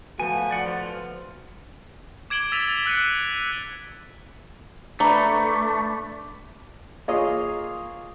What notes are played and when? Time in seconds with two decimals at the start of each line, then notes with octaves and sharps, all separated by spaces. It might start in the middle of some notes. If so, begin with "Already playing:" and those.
0.20 F3 A3 B3 F#4 G#5
0.51 D5 F#5
0.66 F3 F4
2.30 D6 G#6 D7 F#7 G7
2.52 E6 A6 B6 D#7 F7 G7
2.86 E6 F#6 C#7 D#7
5.00 A3 D4 B4 A#5
7.08 A#3 F4 G#4 C#5 D#5